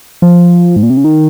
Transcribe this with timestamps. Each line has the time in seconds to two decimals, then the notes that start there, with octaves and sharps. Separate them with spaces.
0.22 F3
0.76 G#2
0.83 A#2
0.90 C3
0.97 C#3
1.04 D#3